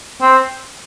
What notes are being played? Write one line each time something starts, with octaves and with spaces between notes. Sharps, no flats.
C4